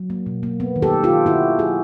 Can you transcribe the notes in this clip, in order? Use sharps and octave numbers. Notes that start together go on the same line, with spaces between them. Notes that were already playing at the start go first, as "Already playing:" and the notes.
Already playing: F#3
A#3
B2
A#3
B3
D#3
G4 A4
B3
F4 G4
D#3
D#3 E4 F#4
D#3
F#3 F#4 G#4